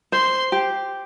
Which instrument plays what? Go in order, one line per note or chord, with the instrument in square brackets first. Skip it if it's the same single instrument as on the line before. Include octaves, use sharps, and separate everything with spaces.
[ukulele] C5 [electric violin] C6
[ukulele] G4